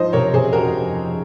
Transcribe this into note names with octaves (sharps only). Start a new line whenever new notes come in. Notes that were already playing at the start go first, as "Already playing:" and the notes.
Already playing: G#2 F3 C5 D#5
C3 A#4 C#5
C3 G#4 C5
F2 F#4 A#4
F2
F2